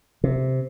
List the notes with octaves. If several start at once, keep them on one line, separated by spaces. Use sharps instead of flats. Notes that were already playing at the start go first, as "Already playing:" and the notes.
C3